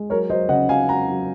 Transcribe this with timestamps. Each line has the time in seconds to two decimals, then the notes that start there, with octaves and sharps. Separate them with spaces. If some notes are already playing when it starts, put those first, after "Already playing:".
Already playing: G#3
0.10 F#3 A#4 C#5
0.30 F#3 C5 D#5
0.49 C#3 D#5 F#5
0.69 F#3 F5 G#5
0.89 F#3 F#5 A#5
1.08 F#3